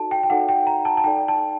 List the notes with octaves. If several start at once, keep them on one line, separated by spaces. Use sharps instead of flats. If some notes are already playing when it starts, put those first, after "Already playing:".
Already playing: D#4 F#4 A4 D5 A5
G5
G5
D#4 F#4 A4 D5 F#5
G5
A#5
A5
A5
D#4 A4 D5 G5
A5